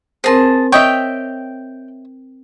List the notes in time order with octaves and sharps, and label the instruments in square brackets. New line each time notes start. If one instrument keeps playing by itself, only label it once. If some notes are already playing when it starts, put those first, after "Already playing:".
[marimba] C4 A#4 C5 [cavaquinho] G#4 A5
[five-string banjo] C#5 D#5 E5 [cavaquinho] G5